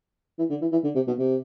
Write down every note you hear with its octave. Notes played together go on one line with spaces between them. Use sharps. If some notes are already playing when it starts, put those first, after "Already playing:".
E3
D3
E3
E3
D3
C3
B2
C3